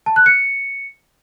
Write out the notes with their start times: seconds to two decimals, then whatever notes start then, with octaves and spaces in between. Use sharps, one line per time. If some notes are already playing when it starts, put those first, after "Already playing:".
0.06 A5
0.16 F#6
0.26 C#7